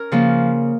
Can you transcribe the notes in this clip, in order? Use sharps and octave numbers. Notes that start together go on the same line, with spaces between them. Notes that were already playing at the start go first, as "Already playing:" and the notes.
Already playing: C#4 A#4
C#3 F3 A#3